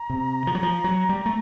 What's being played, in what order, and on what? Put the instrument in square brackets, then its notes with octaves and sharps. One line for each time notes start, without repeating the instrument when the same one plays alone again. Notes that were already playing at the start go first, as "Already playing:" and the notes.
Already playing: [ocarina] A#5
[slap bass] C3
F3
F#3
F3
F#3
G3
A3